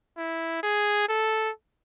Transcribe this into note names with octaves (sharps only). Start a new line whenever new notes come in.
E4
G#4
A4